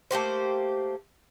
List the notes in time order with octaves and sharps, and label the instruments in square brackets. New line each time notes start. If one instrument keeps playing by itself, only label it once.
[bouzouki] A3 A#3 G4 C5